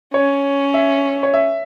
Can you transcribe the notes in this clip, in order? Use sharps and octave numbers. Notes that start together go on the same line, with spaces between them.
C#4 C#5
E5
C#5
E5